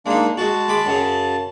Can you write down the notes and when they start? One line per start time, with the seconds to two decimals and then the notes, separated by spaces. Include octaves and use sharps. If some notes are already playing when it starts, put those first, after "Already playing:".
0.06 G#3 A#3 D4 D#4
0.37 G#3 F#4 A5
0.68 G#3 B5 D6
0.86 F#2 C#3